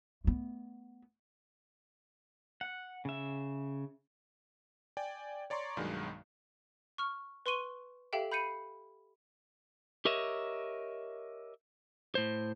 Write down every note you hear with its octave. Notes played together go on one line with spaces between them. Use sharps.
A3 B3
F#5
C#3 E5
D5 G5 G#5
C#5 D5 A#5 C6 C#6
B1 G2 D#3 F#3 G#3
C#6 F6
B4 C6 C#6 D#7 G7
G4 A4 E5 F5 G5
B5 G6 C7 C#7 D#7
G4 A#4 C#5 D#5 E5
A2 C5